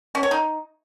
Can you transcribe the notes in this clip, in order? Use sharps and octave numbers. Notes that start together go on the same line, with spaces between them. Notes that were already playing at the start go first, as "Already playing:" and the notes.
C#4
C#5
D#4